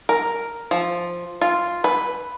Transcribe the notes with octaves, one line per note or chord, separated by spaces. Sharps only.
A#4
F3
F4
B4